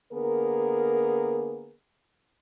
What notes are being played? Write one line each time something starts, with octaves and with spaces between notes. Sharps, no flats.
D3 A#3 B3 G#4 A#4